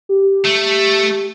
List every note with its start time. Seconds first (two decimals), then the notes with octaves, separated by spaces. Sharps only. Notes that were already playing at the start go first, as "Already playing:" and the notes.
0.09 G4
0.45 A3